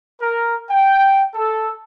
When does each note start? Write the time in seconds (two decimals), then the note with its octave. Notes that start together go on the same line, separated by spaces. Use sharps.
0.21 A#4
0.70 G5
1.34 A4